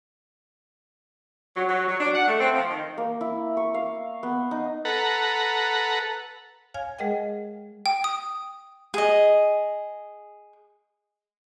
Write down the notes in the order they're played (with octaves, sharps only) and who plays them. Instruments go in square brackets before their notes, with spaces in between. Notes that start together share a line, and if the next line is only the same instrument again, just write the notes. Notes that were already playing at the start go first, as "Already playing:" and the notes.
[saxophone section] F#3
F#3
F#3
D4
F#5
A3
C4
F3
D#3
[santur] A#3
E4
C#6
F5
B3
D#4
[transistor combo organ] A4 B4 F#5 A#5
[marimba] C#5 F5 G#5 F6 G#6
G#3 G#4 A#4 D#5 F#5 G5
[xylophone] G5
D#6
[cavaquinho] G#4 D#5